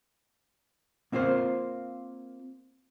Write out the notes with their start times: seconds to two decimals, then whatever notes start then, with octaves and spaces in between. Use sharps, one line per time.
1.12 A#3 C4 F4 A#4 C5